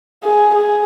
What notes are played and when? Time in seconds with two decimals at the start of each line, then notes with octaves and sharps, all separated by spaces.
0.24 G#4
0.55 G#4